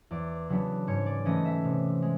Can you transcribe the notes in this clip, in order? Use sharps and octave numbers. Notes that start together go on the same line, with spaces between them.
E2 D5
C#3 F#3 B3 D4
G#2 C#5
D5
E3 A3 C#4 D#5
E5
C3
G#3